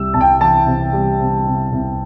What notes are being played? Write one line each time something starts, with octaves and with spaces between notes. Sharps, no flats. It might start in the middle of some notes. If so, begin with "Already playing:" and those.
Already playing: C2 G3 E6
C2 A5
G5
E3 A5
C3
G3
C3
C3
C2